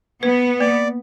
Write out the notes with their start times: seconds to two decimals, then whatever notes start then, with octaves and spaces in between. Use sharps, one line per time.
0.23 B3 B4
0.61 A#3 D5